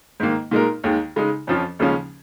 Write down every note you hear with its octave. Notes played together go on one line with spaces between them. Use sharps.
G#2 D#3 A#3
A#2 G#3 D#4 A#4
D#2 D#3 G#3
C#3 G#3 D#4
F2 F3 C#4 F4
D#2 C#3 F3 G#3 C#4